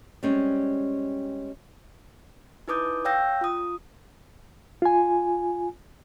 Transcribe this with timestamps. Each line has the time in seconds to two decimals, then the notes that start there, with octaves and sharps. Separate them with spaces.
0.23 G3 G#3 C4 C#4
2.68 D#4 E4 B4 D6 D#6 G6
3.05 C#5 F5 G5 E6 G6 A#6
3.41 F4 D#6
4.82 F4 G#5